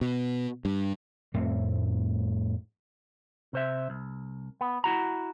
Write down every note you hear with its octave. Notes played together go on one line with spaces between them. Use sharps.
B2
G2
F2 A2 A3 C4
C3 C5 E5
C2
B3
E4 F#4 A#5